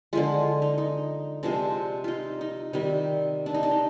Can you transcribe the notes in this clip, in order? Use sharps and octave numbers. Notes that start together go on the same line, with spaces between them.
D3 F3 G#3 F4
D#4
D#4
C3 F3 G#3 D4
D#4 F4
D#4
C3 D#3 G3 D#4
D4
D#4
D4
D#4